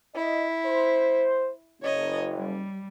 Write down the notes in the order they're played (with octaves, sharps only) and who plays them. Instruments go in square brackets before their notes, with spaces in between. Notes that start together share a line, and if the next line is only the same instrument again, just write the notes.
[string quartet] E4 [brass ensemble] D#5
[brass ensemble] C5
[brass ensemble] F#1 [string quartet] C#5 D#5
[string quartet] G3